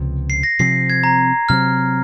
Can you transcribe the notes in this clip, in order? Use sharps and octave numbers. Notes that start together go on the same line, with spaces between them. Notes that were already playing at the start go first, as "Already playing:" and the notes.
Already playing: C#2 C3 F3
C7
A#6
C3 F3 C4 C7
G#6
A#5
C3 F#3 C4 F6